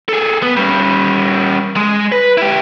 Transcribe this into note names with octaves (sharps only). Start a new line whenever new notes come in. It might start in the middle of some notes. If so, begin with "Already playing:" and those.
G#4 A4
B3
G3 C#4
G#3
B4
E4 G4